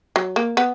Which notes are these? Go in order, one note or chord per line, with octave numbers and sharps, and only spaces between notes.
F#3
A#3
B3